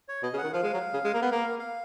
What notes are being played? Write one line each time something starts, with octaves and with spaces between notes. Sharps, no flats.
C#5
B2 D#5
C#3
F#5
D#3
F3 F5
G#3
F#3
C#3
G#3
A#3
B3
A#3
F5
F5